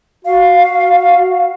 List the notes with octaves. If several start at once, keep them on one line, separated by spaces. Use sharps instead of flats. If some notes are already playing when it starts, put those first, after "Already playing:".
F#4 F5